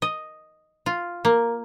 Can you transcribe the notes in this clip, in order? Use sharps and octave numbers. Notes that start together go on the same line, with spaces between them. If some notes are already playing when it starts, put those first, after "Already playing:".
D#5
F4
A#3